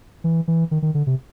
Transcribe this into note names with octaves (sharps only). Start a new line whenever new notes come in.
E3
E3
D#3
D#3
D3
C3